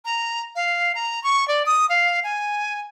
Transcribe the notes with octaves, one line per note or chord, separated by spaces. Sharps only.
A#5
F5
A#5
C#6
D5
D#6
F5
G#5